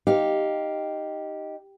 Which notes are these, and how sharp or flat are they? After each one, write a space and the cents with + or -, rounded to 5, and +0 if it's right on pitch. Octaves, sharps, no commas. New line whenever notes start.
D#4 +0 G4 -5 F5 +0